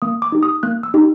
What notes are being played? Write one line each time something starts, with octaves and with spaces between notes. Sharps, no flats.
A#3 D#6
D6
D#4 G4
D#6
A#3 F#6
E6
D#4 G4